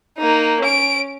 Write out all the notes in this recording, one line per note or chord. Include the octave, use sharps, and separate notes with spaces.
A#3 D#4
C#4 D7